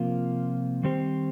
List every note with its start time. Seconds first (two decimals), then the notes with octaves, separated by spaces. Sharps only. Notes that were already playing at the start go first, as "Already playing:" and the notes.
Already playing: C3 F3 A#3 F4
0.83 D#3 G3 C4 G4 C5